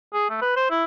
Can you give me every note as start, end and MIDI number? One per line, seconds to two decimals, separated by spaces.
0.13 0.28 68
0.30 0.40 57
0.41 0.54 71
0.56 0.67 72
0.71 0.85 64